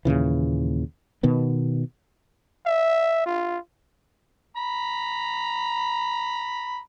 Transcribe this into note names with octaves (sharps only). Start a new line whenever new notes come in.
D#2 A#2 C#3 E3
B2 D#3 B3
E5
F4
A#5 B5